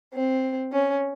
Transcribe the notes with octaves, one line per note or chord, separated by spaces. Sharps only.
C4
C#4